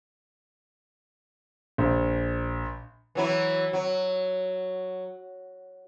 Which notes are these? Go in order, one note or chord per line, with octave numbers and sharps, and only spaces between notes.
A#1
E3 F#3 E4
F#3